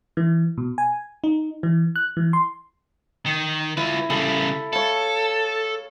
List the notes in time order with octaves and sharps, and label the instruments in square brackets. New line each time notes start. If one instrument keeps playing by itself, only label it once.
[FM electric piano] E3
B2
G#5
D#4
E3
F#6
E3
C6
[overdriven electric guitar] D#3
[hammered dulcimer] E4 [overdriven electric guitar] F4 B4
[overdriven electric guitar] C#3 G3 [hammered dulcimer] E4 A4
[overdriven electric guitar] A4 [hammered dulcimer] C#5 F5